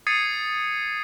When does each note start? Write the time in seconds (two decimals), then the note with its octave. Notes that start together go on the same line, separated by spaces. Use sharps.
0.07 D#6 G#6 A6 C7 C#7 D#7